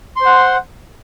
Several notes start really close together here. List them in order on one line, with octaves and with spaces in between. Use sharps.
C6 C5 F#5